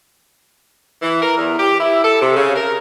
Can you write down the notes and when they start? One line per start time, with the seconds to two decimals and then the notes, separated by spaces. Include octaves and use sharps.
1.02 E3
1.22 A#4
1.38 E2
1.59 G4
1.80 E4
2.04 A4
2.21 C3
2.36 C#3
2.56 A#4